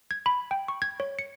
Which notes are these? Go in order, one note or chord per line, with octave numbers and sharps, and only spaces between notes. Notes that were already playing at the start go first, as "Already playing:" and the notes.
G#6
B5
G5
C#6
G#6
C#5
C#7